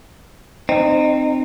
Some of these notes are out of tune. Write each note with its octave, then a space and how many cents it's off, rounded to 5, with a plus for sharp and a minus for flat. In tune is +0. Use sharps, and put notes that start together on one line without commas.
C4 +0 D#4 -25